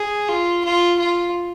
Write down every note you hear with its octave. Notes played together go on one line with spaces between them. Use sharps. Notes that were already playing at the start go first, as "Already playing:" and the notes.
Already playing: G#4
F4
F4
F4